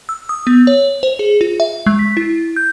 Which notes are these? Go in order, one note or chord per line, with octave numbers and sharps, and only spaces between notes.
E6
D#6
B3
C#5
C5
G#4
F4
E5
G#3
B6
E4
G6